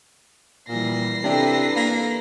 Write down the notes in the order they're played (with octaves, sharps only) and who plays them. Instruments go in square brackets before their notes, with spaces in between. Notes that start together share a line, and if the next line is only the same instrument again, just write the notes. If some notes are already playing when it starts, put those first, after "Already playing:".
[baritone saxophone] A#2 [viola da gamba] E3 F3 G3 [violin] A#6 C7
[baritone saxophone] C3 [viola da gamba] E3 A4 B4 [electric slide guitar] D4 G4
[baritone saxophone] A#3